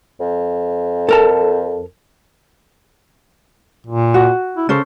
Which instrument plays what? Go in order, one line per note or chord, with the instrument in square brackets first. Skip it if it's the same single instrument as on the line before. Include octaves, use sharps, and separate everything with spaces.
[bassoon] F2
[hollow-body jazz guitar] A4 A#4 A5
[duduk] A#2
[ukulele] F#4
[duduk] E4
[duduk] C#3 [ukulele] C#4 A4 C5